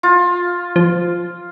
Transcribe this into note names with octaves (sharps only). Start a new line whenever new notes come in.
F4
F3